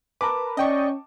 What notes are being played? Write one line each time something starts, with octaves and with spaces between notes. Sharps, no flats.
A#4 B4 A5 D6
C#4 D5 D#5 G5 C#6